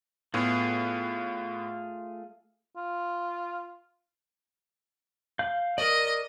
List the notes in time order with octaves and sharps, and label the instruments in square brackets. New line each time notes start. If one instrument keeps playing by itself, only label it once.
[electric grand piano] A2 B3 [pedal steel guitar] A3 F4 G#4
[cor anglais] F4
[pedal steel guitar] F5 G6
[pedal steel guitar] A#4 D5 [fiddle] D#5